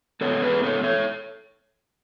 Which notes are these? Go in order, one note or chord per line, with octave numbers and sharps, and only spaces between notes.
G#2 E3 B3 A4 C#5
G#4 B4
A4 C#5
A4 C#5